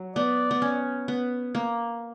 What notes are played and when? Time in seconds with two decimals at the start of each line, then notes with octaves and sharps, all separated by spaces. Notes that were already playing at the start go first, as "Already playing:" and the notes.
Already playing: F#3
0.16 B3 D5
0.51 B3
0.62 C#4
1.08 B3
1.55 A#3